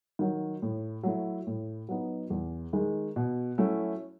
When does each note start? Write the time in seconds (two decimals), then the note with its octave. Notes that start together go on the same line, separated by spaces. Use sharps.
0.19 D#3 F#3
0.62 A2
1.03 F#3 A3 E4
1.47 A2
1.89 F#3 B3 D#4
2.30 E2
2.73 D#3 G#3
3.16 B2
3.58 F#3 A3 C#4 E4